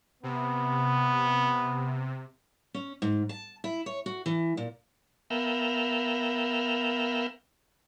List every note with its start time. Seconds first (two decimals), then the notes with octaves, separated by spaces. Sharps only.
0.23 C3 B3
2.74 C#4
3.02 G#2
3.29 A5
3.64 E4
3.86 C#5
4.06 F#4
4.26 E3
4.57 A#2
5.30 B3 A#4 E5 F5 G5